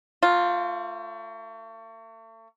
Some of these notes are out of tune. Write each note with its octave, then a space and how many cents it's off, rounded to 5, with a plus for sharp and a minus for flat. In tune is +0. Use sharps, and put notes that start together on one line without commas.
A3 +40 F4 +5